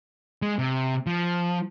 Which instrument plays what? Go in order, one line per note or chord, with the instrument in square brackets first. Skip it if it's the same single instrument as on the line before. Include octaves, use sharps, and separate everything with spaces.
[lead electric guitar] G#3
C3
F3